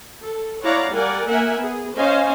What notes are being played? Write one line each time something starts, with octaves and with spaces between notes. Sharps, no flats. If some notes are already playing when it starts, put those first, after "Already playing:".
A4
E4 C#5 D5 F5 F#5 A#5
G3 A#4 D5 F#5 G#5
A#3 A#4 E5 F#5 G#5
B3 G#4
C#4 C5 D#5 F5 G#5